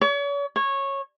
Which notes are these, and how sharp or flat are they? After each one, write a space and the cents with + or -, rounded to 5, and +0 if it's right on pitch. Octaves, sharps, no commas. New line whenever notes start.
C#5 +40
C#5 -15